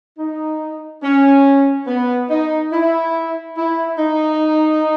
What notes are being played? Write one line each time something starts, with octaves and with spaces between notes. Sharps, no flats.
D#4
C#4
B3
D#4
E4
E4
D#4